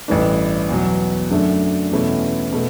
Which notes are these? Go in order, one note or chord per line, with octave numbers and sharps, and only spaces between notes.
A1 G2 E3 A3 D4
E2 B2 F#3
F#2 D3 F#3 A3 D4
E2 B2 A3 C#4 E4
B2 A3